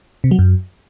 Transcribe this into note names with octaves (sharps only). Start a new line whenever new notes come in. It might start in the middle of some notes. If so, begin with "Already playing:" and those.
C3
F#3
F#2